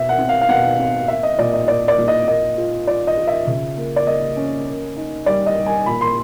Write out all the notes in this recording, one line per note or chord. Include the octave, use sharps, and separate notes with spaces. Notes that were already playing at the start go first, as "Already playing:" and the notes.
Already playing: B2 E5
F#5
C4
F5
F5
B2 F#5
C4
A#3 E5
D#5
A#2 D5
D#5
A#3 D5
D5
A#2
D#5
A#3 D#5
F4
F4 D5
D#5
F4
E5
C#3
A#3
D5
A#3 D#5
C#4
A#3
D#4
G3 D5
D#5
G3
G#5
A#2 B5
C6